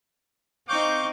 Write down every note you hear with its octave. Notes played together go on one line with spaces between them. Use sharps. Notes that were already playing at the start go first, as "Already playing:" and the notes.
C4 D#4 F5 C#6 D6 G6